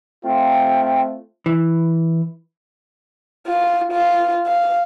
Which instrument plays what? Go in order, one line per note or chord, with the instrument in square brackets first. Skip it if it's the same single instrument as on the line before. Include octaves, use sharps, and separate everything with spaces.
[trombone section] A3 C4 F4 [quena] G5
[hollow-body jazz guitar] E3
[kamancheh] F4
F4
F5